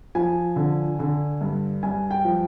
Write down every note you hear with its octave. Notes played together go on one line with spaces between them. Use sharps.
F3 G#5
D3
D3
G2
G2 G#5
G5
F3